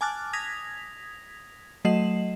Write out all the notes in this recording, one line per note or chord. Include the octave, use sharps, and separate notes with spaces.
G#5 A5 D6 F6 F#6 A6
D#6 G#6 A#6 B6 F7
F#3 A3 D#5 C7 E7 F#7